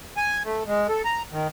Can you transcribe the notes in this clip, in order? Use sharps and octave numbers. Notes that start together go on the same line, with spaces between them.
G#5
A3
G#3
A4
A#5
D#3